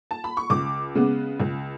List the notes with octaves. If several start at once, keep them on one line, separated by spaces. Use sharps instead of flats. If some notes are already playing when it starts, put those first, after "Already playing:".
A5
B5
C#6
C#2 D6
C#3 G#3 B3
C#2